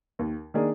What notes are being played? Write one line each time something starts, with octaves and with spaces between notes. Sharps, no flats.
D#2
D#3 A#3 D4 G#4